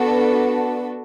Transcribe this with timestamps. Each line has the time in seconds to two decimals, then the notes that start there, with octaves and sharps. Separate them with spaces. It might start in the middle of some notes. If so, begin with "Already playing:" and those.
Already playing: B3 D4 F#4 A4